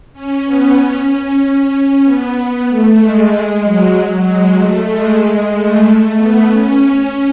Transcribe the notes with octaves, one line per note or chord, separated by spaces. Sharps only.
C#4
B3
C#4
C#4
B3
A3
G#3
F#3
F#3
G#3
A3
G#3
A3
A3
B3
C#4